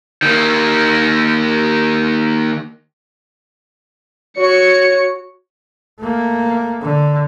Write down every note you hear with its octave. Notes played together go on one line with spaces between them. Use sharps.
D#3 A#3
F#4 C#5 C#7
A3 A#3
D3